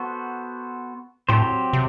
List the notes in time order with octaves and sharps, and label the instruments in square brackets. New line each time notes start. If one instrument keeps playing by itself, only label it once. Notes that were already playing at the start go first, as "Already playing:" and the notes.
Already playing: [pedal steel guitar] B3 F#4 A4 C5
[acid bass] A2 [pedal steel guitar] F#3 C4 G4 C5
[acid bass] C3